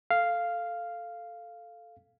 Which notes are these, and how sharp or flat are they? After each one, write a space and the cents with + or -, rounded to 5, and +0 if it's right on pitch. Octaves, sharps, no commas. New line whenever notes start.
A4 +0 F5 -5